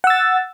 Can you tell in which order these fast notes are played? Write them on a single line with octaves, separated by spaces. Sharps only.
F#5 E6 A6